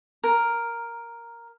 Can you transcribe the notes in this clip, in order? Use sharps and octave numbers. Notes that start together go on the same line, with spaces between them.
A#4